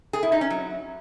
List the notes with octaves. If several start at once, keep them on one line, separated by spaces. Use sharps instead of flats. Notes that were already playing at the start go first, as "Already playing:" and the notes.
G#4
E4
D#4
C#4
F#3